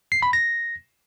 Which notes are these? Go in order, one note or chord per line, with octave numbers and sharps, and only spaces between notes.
C7
B5
A#6